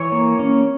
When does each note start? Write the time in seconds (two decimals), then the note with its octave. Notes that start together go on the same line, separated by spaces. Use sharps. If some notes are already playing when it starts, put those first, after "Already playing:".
Already playing: E3 C#5
0.12 A#3
0.39 C#4